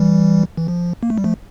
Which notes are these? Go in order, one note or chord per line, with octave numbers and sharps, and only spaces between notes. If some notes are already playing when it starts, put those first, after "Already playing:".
Already playing: E3 G3
E3
F3
A#3
A3
G3
F3 A3